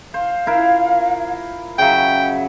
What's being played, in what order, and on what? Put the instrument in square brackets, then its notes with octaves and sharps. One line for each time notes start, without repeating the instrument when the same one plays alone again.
[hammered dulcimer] C5 [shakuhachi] F5
[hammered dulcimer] E4 F4 A#4
[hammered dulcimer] C#3 F#3 [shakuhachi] E5 [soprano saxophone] G5